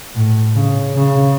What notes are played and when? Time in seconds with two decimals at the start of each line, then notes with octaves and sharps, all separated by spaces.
0.15 A2
0.56 C#3
0.96 C#3